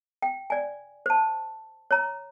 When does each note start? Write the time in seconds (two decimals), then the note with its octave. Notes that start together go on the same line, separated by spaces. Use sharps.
0.22 G5
0.50 D5 G#5
1.06 C5 A5
1.91 C#5 A#5